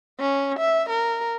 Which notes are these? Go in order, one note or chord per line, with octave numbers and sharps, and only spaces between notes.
C#4
E5
A#4